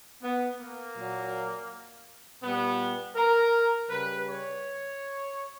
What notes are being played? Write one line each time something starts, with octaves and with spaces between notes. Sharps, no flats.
B3
A#3
A#2 F#3
A#2 G3 B3
A#4
C#3 G3 B4
C#5